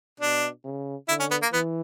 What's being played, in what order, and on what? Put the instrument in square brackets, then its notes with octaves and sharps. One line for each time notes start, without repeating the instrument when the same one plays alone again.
[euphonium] B2 [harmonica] D4
[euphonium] C#3
[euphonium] D3 [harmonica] E4
[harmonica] C#4
B3
A#3
[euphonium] E3 [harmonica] B3